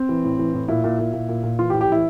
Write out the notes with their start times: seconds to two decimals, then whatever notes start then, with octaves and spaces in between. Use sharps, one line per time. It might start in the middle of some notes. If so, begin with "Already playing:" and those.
Already playing: C4
0.09 E3
0.24 A2
0.39 E3
0.54 A2
0.68 A#2 E4
0.84 A#2
0.99 A#2
1.13 A#2
1.29 A#2
1.43 A#2
1.59 E3 F4
1.70 G4
1.73 A2
1.81 G4
1.89 E3 E4